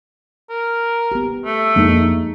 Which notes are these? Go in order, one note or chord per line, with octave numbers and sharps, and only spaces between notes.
A#4
B3 G4
A3
F2 G#3 A#3 D4 D#4